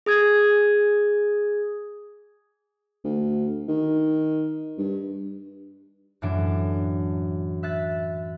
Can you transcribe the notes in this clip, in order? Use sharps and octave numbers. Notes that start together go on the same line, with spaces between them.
G#4 D#6 G#6
D2
D#3
G2
F#2 A2 E3 D4 D7
E5 F#6 A6 B6